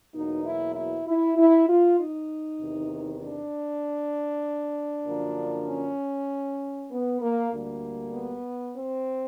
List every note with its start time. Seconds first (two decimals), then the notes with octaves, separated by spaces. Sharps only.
0.14 E2 B2 F#3 A#3 D#4
0.45 E4
0.75 E4
1.06 E4
1.37 E4
1.68 F4
1.98 D#4
2.60 E2 C3 D#3
3.21 D4
5.06 F#2 D3 F3 A#3
5.68 C#4
6.91 B3
7.22 A#3
7.52 D2 D3 G3 A#3
8.14 B3
8.75 C4